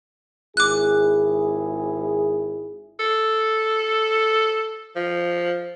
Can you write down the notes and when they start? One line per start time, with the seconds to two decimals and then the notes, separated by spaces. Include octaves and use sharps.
0.57 G#1 E4 G#4 D6 F#6
2.99 A4
4.96 F3